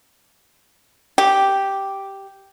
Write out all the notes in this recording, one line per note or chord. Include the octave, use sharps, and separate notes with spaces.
G4